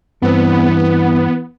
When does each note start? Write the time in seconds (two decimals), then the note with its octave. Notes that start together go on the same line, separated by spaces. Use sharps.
0.22 G2 E3 B3 C4